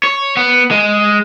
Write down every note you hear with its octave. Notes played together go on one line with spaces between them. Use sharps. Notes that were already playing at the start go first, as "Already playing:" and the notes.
C#5
B3
G#3